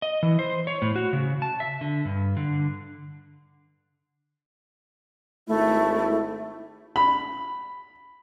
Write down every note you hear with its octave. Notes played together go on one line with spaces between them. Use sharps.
D#5
E3
C5
C#5
A2
F#4
C#3
A5
E5
D3
G2
D3
G#1 A3 E4
B5